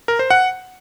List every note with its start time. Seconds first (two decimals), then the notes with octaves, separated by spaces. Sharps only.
0.08 A#4
0.19 C5
0.30 F#5